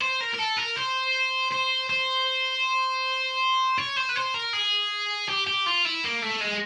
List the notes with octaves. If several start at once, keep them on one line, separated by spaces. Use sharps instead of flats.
C5
A#4
A#4
A4
A#4
C5
C5
C5
C#5
C5
B4
C5
A#4
G#4
G4
G4
F4
E4
A#3
A3
G#3